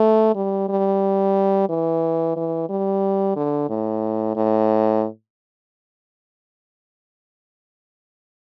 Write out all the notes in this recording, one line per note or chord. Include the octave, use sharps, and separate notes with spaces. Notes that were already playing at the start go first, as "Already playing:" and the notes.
Already playing: A3
G3
G3
E3
E3
G3
D3
A2
A2